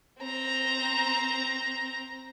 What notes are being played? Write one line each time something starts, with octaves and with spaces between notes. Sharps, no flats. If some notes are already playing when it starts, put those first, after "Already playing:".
C4 A#5